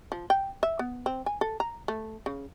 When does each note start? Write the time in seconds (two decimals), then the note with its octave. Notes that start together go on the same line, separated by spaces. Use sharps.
0.12 F3
0.30 G5
0.63 E5
0.79 B3
1.06 C4
1.26 G#5
1.41 A4
1.60 A#5
1.88 A3
2.26 C#3